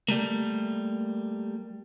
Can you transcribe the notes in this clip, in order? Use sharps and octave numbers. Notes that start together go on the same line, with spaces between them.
G3 A3 A#3